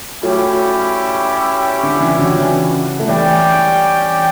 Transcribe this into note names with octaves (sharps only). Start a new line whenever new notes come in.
F#3 G3 A3 C#4 E4 G4 C#5
D3
C#3 E3
D3 F#3
C#3 E3
A3
E3 G3 C#4 G4 D5 G5